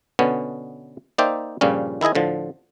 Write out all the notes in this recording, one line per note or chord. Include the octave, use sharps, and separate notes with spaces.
B2 D3 B3 C#4
A#3 D#4 C5 D5 E5 G5
G2 A#2 C#3 F3 G3 C#4
D#3 E4 G#4 D#5 G#5
A2 D3 F3